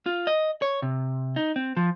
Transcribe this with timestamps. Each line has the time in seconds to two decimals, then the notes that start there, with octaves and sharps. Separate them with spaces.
0.06 F4
0.27 D#5
0.62 C#5
0.82 C3
1.36 D#4
1.56 C4
1.77 F3